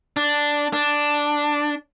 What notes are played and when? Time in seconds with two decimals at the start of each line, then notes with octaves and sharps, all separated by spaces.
0.17 D4
0.73 D4